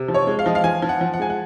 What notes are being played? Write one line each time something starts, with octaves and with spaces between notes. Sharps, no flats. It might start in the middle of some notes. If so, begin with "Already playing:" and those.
Already playing: C3
F3
C#5
G#3
F5
F3 D#5
F5
F3 G#5
F3
F#5
F3
F#5
G#3 G#5
F#5